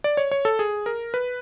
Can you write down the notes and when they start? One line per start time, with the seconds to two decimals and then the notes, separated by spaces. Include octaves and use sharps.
0.04 D5
0.17 C#5
0.31 C#5
0.45 A4
0.59 G#4
0.86 A#4
1.14 B4